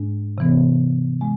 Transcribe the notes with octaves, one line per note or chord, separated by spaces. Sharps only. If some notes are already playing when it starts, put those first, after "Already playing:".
Already playing: G#2 G#3 D4
C3 E3 B3
G#3